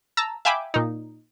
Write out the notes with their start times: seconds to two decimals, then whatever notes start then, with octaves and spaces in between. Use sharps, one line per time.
0.17 A5 A#5 E6
0.45 E5 F5 G5 G#5 B5 D6
0.74 A#2 D#4